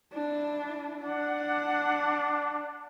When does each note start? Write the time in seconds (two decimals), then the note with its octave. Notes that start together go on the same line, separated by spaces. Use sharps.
0.13 D4 E4
1.05 D4 F#5